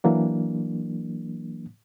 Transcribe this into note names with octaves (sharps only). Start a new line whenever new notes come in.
E3 F#3 A#3 D4